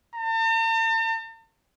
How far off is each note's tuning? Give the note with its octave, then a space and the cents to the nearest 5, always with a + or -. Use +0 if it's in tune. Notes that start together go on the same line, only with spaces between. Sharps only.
A5 +45